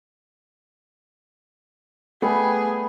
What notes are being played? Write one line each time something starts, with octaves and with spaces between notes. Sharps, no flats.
G3 A3 B3 G#4